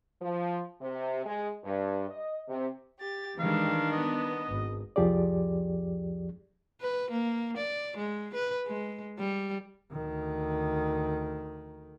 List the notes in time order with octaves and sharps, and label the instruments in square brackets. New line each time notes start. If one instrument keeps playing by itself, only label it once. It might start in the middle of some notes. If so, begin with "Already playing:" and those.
[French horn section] F3
C3
G#3
G2
D#5
C3
[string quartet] G4 A6
[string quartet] D#3 D4 [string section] E3 G3 G#3 [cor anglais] F5
[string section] B3 [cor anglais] D#5
[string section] G#1
[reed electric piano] C2 F2 F3 G4 G#4 D5
[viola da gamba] B4
A#3
D5
G#3
B4
G#3
G3
[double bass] D2 D#3